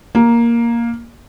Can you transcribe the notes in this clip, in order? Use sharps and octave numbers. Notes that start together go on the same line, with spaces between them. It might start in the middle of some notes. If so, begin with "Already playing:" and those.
A#3